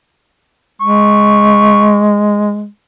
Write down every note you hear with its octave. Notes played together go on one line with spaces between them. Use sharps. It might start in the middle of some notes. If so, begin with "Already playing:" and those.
G#3 C#6